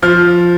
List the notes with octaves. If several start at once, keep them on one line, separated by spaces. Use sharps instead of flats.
F3 F6